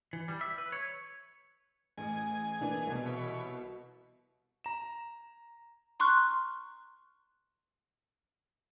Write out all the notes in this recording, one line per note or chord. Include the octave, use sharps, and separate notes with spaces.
E3
G3
E5
B4
C#5
A1 G#4 G#5
E3 A#3 D4
C2 B2
E3 C#5 B5
A#5 E7
A#5 C6 C#6 F6 F#6